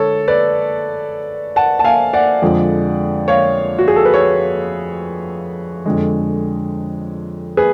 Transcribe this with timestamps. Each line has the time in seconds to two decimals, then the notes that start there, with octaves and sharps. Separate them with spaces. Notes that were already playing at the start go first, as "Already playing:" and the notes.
Already playing: D3 G#3 A4 C#5
0.28 B4 D5
1.56 F#5 A5
1.79 A5
1.84 F5 G#5
2.13 D5 F#5
2.42 F2 D3 F3 G#3
3.28 C#5 F5
3.79 F#4
3.88 G#4
3.96 A4
4.05 B4
4.14 A4 C#5
5.86 F2 D3 G#3
7.57 G#4 B4